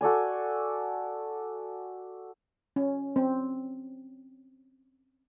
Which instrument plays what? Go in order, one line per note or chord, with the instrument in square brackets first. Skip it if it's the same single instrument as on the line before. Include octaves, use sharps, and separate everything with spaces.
[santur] F#4 A4 D5 G#5
[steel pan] C#4
C4